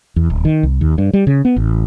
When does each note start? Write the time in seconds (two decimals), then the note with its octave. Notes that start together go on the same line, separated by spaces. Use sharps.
0.16 E2
0.30 D1
0.45 D#3
0.63 C2
0.81 D#2
0.98 G2
1.13 G3
1.27 C#3
1.45 B3
1.56 A1